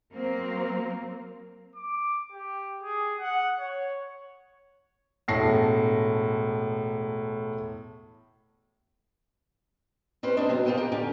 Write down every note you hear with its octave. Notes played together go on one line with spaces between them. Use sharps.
F#3 A#3 C4
D6
G4
G#4
F#5
C#5
E1 A2 A5 A#6 C7
C4 C#4 G4 B4 C5
C4 D4 C5 C#5 D#5
C3 F#3 B3
F4 G4 A#4 C5 D#5 G5
G4 A#4
D3 C#4 G4